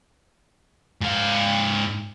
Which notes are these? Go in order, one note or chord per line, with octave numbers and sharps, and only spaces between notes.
G#2 F5